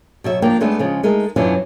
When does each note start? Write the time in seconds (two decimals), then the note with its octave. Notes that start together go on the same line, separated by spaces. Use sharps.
0.24 B2 F#3 E5
0.42 F3 A#3 D4 G5
0.61 D#3 G#3 A3 B3 D4
0.79 C#3 F3 G#3
1.03 G#3 A3 D#4 A#4
1.36 F#2 B2 E3 F#3 D4 F4